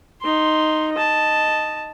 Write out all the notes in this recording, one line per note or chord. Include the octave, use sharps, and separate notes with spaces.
D#4 C6
D#5 A5